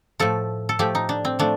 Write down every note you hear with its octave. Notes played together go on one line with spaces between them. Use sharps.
A2 F3 A3 A4
A4
A2 F3 A3 G4
D#4
D4
C4
A2 F3 A3 D4